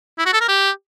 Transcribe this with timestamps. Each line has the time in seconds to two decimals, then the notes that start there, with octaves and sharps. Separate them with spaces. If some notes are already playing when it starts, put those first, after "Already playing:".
0.18 E4
0.26 F#4
0.33 A4
0.41 A#4
0.48 G4